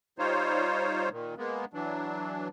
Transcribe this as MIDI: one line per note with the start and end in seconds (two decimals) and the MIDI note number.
0.19 1.09 55
0.19 1.09 63
0.19 1.09 65
0.19 1.09 72
0.19 1.09 73
1.12 1.34 46
1.12 1.34 51
1.38 1.65 56
1.38 1.65 58
1.38 1.65 59
1.74 2.48 52
1.74 2.48 54
1.74 2.48 62